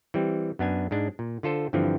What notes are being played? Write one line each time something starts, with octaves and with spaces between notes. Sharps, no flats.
E3 G3 C4
F#2 B3 D4 G#5
G#2 G#3 D4
A#2
D3 F4 A4 C5
G2 D3 E3 F3 C4